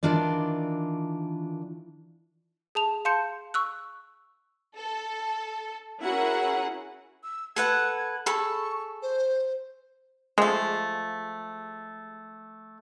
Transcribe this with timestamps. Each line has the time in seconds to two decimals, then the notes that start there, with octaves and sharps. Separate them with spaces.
0.03 D#3 E3 D4 F4 D5
2.75 G#4 A5 F7
3.05 F5 A5 C6 G6 C#7
3.54 C#6 E6 F#6
4.77 A4
6.00 C#4 E4 F#4 G#4 A#4 F#5
7.23 E6
7.56 A4 B4 F#5 G#6
8.26 G#4 A4 B5 C#6
9.02 C5
10.38 F3 G#3 A3